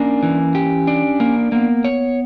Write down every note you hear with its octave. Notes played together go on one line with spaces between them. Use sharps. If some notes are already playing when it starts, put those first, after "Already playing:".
Already playing: A#3 C#4 D4
E3
G4
D4
A#3
A#3 B3
C#5